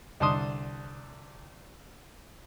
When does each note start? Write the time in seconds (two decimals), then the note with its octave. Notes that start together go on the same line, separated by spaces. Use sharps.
0.20 C2 D3 A5 C6 D#6